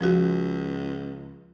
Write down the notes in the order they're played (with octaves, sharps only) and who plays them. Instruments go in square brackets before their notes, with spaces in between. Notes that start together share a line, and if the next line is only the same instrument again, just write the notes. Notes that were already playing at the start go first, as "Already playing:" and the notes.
[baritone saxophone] C#2 [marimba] F3 F#4